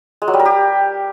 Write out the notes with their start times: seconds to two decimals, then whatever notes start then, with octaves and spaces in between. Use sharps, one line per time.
0.22 G#3
0.28 F#3
0.33 G3
0.39 A#4
0.45 G4